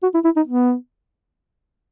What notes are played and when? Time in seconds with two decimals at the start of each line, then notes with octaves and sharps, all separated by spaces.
0.03 F#4
0.14 E4
0.24 E4
0.36 D#4
0.47 B3